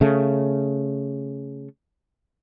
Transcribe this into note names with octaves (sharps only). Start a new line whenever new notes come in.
C#3 A3